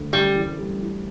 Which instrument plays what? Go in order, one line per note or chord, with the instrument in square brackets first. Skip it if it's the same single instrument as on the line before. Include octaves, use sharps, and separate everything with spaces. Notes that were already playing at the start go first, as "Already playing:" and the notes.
Already playing: [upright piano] D2
[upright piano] F#2 [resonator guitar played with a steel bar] G3
[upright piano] E3
G3
E3